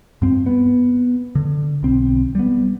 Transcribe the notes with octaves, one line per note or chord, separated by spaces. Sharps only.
G2 C4
B3
D3
B1 C4
G3 B3